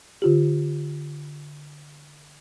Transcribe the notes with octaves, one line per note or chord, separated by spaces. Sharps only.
D3 F4 G4